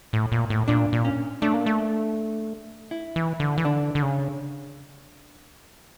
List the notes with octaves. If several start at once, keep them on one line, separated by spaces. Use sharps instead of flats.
A2
A#2
A2
A#2 D4
A#2
C#4
A3 D4
A#3
A3
E4
E3
D3
E3
D3 D4
D3
C#3